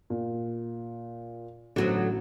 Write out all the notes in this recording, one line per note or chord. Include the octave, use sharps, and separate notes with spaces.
A#2
A1 D3 F#3 B3 F#4